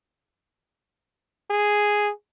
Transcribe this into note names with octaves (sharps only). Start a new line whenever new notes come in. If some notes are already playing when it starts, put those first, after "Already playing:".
G#4